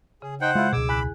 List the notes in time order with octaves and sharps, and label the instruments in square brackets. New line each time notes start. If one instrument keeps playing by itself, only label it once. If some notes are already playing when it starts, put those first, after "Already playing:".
[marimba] C#3 [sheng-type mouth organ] G#4
[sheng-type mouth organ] D#4 G5 [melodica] C5 F#5
[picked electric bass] G#3 [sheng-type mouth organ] E4 F4
[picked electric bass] C#2 B2 [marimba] G#4 [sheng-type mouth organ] D6 E6
[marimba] E2 F#6 [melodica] B5